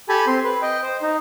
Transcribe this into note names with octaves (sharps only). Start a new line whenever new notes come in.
G4 A4 G#5 A5 B5
C4 C6
B4
D#5 G5
C5
D#4